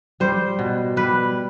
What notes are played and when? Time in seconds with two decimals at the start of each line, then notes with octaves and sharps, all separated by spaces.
0.20 G3 C5
0.59 B2
0.96 G3 B4